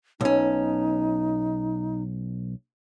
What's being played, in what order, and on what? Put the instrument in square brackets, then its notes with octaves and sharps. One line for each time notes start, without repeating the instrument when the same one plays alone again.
[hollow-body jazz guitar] B1 C#4 [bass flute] D#4